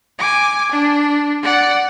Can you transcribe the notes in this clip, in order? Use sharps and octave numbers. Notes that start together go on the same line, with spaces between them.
G#5 D6
D4
D5 F#5